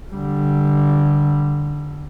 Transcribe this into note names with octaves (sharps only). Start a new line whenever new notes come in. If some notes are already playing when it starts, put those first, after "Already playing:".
D3 G3